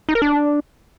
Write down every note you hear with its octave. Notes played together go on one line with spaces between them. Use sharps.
D#4
A#4
D4